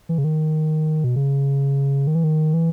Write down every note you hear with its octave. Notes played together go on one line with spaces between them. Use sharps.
E3
C#3
D#3
B2
C#3
D#3
E3
D#3
E3